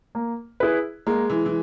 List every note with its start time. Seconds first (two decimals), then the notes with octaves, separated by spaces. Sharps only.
0.15 A#3
0.60 E4 G#4 B4
1.07 G#3 A#3
1.30 E3
1.46 E3